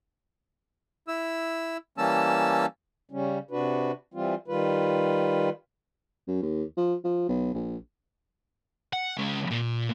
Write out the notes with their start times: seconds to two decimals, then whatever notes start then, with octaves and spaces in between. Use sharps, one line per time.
1.08 E4 E6
1.98 E3 G3 A#3 C#4 A5 E6
3.11 C#3 G3 C#4
3.51 C3 D4 F#4 B4
4.14 E3 G3 C4 F4
4.48 D#3 G3 F4 B4
6.28 F#2
6.42 D#2
6.77 F3
7.04 F3
7.29 B1
7.54 A#1
8.93 F#5
9.18 C#3 G#3
9.51 A#2